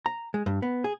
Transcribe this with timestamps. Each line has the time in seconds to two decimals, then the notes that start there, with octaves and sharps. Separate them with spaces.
0.06 A#5
0.34 G#3
0.46 G2
0.62 B3
0.84 G#4